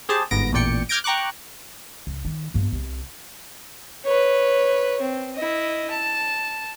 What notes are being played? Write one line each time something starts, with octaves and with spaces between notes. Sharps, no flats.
G4 G#4 C5 A5
G1 G#2 B3 A#6 D7
A1 E2 A#2 D5 G5 C#7
D6 F6 G6 G#6 A#6 D7
G5 A#5 C#6 D6 F#6
C#2
D#3
G2 B3
C2
B4 C#5
C4
E4 D#5
A5